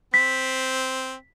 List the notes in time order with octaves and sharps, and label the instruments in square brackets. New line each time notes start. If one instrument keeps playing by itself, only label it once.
[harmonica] C4 [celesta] B6